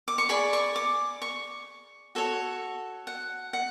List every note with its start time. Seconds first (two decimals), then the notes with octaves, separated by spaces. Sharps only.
0.08 D6
0.18 C#6
0.29 G#4 D5 B5
0.53 C#6
0.76 D6
1.22 C#6
2.15 F#4 A4 C#5
3.07 F#5
3.53 F#5